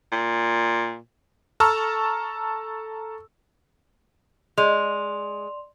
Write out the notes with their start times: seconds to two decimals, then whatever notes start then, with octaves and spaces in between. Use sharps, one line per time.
0.12 A#2
1.60 A4 A5 A#5 C#6 E6 F6
4.58 G#3 D5 C6 F7